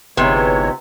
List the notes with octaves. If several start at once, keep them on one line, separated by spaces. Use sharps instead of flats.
G1 C3 E3 G#3 B3 D#4 F4 C#5